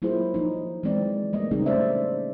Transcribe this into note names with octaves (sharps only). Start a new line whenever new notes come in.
F#3 A#3 E4 F4 G#4 C5
F3 D#4
E3 F#3 G#3 C4 D5
F#3 G3 A3 A#3 D#5
C#3 F#3 G3 C4 D#4 G#4
A3 A#3 C#4 C5 D5 E5